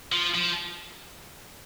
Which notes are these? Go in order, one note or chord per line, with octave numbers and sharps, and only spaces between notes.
F3
F3